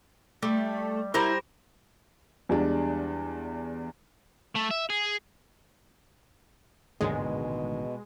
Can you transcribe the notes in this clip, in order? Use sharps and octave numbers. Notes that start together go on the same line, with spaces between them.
G3 A3
G3 E4 A#4 C5
E2 G3 G#3 D4
A3
E5
G#4
A1 D#2 G#2 B2 D3 D#3 F#3 G#3